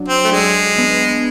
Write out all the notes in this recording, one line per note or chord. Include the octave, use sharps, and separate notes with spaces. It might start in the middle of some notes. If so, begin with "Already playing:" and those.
Already playing: F#3 D4
C4
A3
G#3 D4
B3